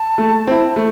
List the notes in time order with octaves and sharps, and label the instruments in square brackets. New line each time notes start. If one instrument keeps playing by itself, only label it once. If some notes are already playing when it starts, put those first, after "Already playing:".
Already playing: [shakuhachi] A5
[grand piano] A3
C4 E4
A3